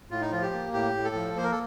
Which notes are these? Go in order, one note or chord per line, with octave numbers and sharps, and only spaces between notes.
A2 F4
D#4
F3 F4
G4
A#3
A2 G4
A2
A4
F3
A#3 C5
A#4
A4